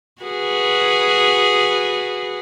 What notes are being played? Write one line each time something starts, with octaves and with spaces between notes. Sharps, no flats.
F#4 G#4 B4